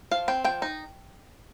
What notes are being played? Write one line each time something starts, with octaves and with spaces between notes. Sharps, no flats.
F3 F5
C4 G5
F3 G5
D#4